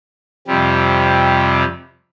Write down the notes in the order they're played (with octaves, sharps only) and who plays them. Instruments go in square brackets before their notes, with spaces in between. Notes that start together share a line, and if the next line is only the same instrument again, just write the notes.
[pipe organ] F2 C3 G3